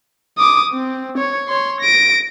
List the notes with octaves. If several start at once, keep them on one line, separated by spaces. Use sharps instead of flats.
D6 D#6
C4
C#5
C#5 C6
A#6 D7